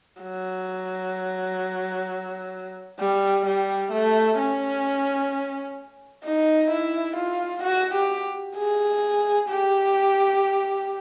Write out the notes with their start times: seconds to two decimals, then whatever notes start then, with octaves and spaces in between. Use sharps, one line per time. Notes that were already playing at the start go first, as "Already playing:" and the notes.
0.21 F#3
2.99 G3
3.46 G3
3.92 A3
4.39 C#4
6.25 D#4
6.71 E4
7.17 F4
7.63 F#4
7.94 G4
8.56 G#4
9.49 G4